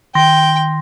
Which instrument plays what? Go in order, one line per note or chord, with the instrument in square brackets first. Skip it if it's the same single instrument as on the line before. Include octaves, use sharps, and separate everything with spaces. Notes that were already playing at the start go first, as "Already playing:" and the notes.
[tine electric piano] D#3 C6 A#6 [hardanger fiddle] G5